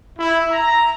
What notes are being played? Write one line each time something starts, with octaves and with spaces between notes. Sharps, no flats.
E4
A#5